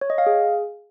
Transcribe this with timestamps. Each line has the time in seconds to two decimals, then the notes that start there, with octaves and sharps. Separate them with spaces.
0.01 C#5
0.10 D#5
0.18 F5
0.27 G#4